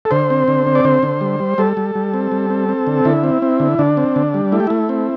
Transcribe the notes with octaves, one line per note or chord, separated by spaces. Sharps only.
A4
D3 C5
C4
D3
C4
D5
D3 C5
D3
G3
G3
G3 A4
G3
G3
C4
G3
C4
C4
D3
D3 E4
C4
C4
D3
D3 D4
C4
D3
G3
A3 E4
G4
A3 E4
C4